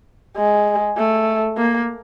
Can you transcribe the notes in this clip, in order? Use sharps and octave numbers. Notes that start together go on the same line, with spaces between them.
G#3
A3
A#3